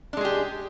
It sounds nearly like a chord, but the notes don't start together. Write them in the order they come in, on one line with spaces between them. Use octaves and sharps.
D4 G#3 G#4 G4